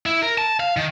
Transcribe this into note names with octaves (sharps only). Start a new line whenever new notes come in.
E4
A#4
A5
F5
D#3